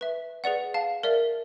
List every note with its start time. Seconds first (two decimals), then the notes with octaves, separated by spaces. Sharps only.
0.01 B4 E5
0.44 G#4 B4 D5 F#5
0.74 F5 A5
1.03 A#4 D5 E5